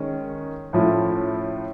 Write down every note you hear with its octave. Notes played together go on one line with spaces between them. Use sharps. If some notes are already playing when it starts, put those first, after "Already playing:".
Already playing: D#3 G#3 C#4
A2 F3 A3 C#4 E4